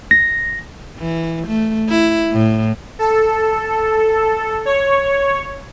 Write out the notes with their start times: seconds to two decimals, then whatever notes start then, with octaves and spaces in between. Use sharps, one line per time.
0.11 A#6
0.99 E3
1.47 A3
1.89 E4
2.32 A2
2.99 A4
4.65 C#5